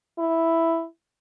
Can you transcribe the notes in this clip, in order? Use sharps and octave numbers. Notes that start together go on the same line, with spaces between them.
E4